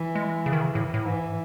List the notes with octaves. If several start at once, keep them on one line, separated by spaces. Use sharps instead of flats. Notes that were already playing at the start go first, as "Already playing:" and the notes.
Already playing: E3
G#3
C#3
D#3
C#3
A2
A2
G#2 E3